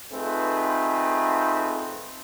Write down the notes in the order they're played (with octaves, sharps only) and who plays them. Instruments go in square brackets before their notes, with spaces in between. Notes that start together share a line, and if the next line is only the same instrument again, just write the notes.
[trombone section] A3 C4 D#4 F4 G#4 B4